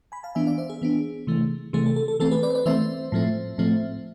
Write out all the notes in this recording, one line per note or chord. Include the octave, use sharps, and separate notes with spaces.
G#5 B5
F5 A5
E3 B3 D4 E5 G#5
D5 F5
C5 E5
G#4
E3 B3 D4
C3 E3 A3
C3 E3 A3 G#4
A4
A4
A4
E3 A3 C4 A4
G#4 B4
B4 D5
C5
B4 D5
E3 A3 C4 C5 E5
A2 F3 A3 C4
A2 F3 A3 C4